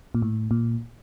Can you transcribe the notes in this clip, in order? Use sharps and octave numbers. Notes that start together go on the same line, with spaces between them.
A#2
A2
A#2